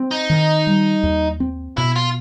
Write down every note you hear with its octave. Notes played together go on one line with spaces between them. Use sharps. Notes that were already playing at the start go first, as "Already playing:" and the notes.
Already playing: C4
D#4
D#3
G3
D#2
C4
B2 E4
F4